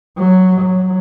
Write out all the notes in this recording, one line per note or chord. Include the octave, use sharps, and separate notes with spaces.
F#3
F#3